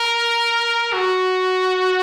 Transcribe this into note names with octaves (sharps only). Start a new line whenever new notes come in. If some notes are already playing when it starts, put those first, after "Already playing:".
Already playing: A#4
F#4